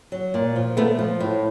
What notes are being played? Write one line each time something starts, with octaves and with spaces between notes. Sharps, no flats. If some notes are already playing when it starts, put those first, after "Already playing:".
F#3
A#2
F3
A#2 A3 B3
F3
A2